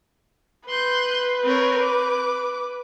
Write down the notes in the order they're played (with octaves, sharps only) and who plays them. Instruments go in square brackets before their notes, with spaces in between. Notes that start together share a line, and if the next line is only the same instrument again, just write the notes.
[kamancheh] B4 [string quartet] C6 F#6 G6
[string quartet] C4 A#4 C#5
D6